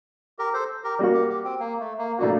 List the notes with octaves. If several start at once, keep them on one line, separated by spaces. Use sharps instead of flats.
G4 A#4
A4 C5
G4 A#4
G3 A#3 F#4
G4
G4
C4
A#3
A3
A#3
A2 A3 A#3 D4 F#4